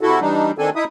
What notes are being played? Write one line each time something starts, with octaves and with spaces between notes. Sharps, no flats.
C3 E4 F#4 A4
E3 G3 D4 D#4
D#3 C4 D4 A4 G#5
D#4 E4 E5 D#6